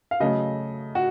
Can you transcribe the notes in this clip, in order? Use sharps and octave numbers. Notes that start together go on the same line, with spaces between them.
F5
C#3 F#3 A3 D#5
F#4